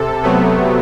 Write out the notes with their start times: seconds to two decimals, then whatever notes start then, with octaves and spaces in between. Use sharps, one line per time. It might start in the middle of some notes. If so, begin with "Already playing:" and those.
Already playing: C3 A4
0.23 C3 F#3 A3 B3